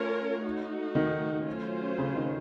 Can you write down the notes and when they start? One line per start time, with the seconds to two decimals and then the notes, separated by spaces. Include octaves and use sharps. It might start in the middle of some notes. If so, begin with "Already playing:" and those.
Already playing: A3 C#4 F4 A#4 C#5
0.44 A3 D#4 F#4
0.95 D#3
1.47 F#3 A3 C#4 F4 C5
1.98 C#3
2.15 D#3